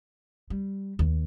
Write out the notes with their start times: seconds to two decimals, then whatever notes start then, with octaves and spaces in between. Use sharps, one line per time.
0.50 G3
0.99 D#2